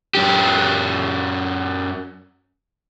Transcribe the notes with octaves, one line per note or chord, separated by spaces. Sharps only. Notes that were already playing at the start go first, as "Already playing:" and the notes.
F#2 G4